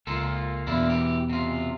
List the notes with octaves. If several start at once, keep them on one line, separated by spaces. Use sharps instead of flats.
C#2 A#3 F4 A4
E2 B2 A#3 D4 E4
E3 G4
C3 F4